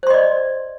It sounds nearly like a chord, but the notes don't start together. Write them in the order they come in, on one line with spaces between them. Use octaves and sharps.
C5 C6 D#5 D5